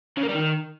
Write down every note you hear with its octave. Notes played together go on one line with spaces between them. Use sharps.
C#3
A#3
G3
D#3